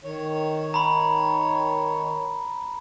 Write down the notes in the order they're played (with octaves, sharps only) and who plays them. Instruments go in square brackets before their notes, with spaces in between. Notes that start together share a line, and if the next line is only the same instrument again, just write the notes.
[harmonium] D#3 C#5
[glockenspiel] A#5 B5